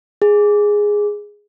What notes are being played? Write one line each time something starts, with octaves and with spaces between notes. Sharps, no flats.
G#4